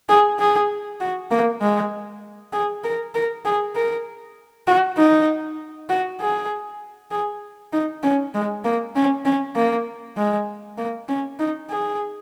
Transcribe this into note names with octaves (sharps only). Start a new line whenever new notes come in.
G#4
G#4
F#4
A#3
G#3
G#4
A#4
A#4
G#4
A#4
F#4
D#4
F#4
G#4
G#4
D#4
C#4
G#3
A#3
C#4
C#4
A#3
G#3
A#3
C#4
D#4
G#4